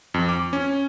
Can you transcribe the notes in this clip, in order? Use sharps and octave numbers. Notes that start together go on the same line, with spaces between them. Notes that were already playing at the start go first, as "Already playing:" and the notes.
F2
D6
C#4